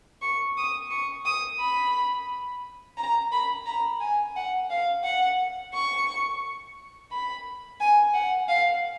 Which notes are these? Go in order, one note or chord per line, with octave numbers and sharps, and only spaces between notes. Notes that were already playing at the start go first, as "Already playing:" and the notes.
C#6
D#6
C#6
D#6
B5
A#5
B5
A#5
G#5
F#5
F5
F#5
C#6
B5
G#5
F#5
F5